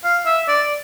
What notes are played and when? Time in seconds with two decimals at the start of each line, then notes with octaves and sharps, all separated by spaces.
0.04 F5
0.26 E5
0.48 D5